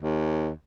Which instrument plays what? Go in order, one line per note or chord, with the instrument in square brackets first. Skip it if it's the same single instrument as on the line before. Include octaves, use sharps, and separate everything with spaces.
[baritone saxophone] D#2